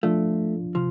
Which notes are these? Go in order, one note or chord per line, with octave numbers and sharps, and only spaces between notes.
F3 A3 D4 F4
C3 F3